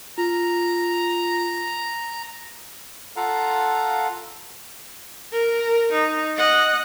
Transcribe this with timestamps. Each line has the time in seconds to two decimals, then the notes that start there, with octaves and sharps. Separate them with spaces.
0.18 F4 A#5
3.16 F4 A4 F5 F#5 A#5
5.32 A#4
5.92 D#4
6.36 D#5 F#5